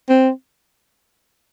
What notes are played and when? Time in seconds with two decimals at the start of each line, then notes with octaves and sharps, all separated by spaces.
0.09 C4